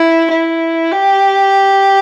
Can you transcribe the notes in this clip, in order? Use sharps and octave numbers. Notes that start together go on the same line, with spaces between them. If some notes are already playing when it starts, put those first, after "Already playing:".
Already playing: E4
E4
G4